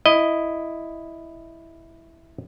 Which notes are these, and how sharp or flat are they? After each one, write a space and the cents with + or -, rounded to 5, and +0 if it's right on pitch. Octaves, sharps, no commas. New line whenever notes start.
E4 +0 D#5 -5